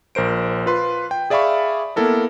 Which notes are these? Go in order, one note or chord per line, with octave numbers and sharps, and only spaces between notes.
A#1 A#4 C5 D7
F4 B4 C6
G5
G#4 D5 E5 F5 B5 C#6
A#3 B3 E4 A4 A#4